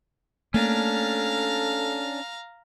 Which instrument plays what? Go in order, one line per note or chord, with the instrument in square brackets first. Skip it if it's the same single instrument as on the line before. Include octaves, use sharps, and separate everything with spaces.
[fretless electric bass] A3 A#3 [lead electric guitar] C#4 D4 [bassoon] A4 [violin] F5 A#5